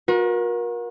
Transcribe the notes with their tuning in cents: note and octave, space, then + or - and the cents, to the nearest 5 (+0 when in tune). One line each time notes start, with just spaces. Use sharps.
F#4 -40 A#4 +30